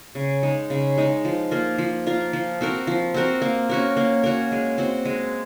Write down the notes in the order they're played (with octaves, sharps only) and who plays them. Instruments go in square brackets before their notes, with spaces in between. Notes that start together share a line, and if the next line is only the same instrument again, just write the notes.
[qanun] C#3
G#3 D#4
C#3
G#3 D#4
F3
A#3 F4 A#4
F3
A#3 F4 A#4
F3
C4 F#4 A#4
F3
C4 F#4 A#4
A#3
C#4 F#4 A#4
A#3
C#4 F#4 A#4
G#3
C4 F#4
G#3